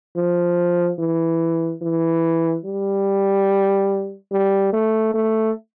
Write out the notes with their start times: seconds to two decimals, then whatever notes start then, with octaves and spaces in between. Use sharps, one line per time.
0.16 F3
0.99 E3
1.82 E3
2.66 G3
4.32 G3
4.73 A3
5.14 A3